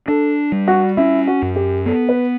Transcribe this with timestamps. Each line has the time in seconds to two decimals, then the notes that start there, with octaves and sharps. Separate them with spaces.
0.08 D4 A4
0.52 G3
0.68 F#4
0.97 C#4 E4
1.27 F#4
1.42 F#2
1.56 G4
1.86 B3 A4
2.09 B4